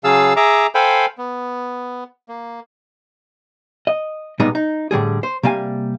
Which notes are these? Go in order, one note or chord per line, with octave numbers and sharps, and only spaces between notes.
C#3 F#3 G#4 F5 A5 E6
G#4 E5 A#5 D6
A4 C5 F5 G5 G#5 B5
B3
A#3
D#5
B1 A#2 G3 G#3 B3 D#4
D#4
A2 D3 G3 G#4
C5
C3 G3 A#3 F5 G#5